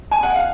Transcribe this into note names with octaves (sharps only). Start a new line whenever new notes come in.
G#5
F#5
F5